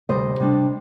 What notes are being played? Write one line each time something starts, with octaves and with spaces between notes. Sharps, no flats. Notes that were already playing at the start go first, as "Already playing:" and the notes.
D2 C3 G3 C5 D#5
C3 G3 D4